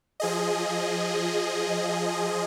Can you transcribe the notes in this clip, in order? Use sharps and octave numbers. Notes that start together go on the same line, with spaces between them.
F3 G#4 D#5